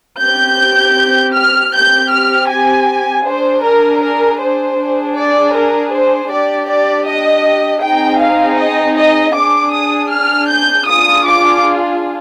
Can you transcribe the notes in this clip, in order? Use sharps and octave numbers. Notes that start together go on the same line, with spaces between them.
C4 G4 G6
F6
C4 G4 G6
F6
G#5
D4 G#4 C5
A#4
A#4
C5
D4 G#4
D5
A#4
C5
D4 G4 D5
D5
D#5
C4 D#4 G#4 G5
F5
D#5
D#5
D4 G#4 D6
D#6
F6
G6
D4 F4 G#4 D#6
D6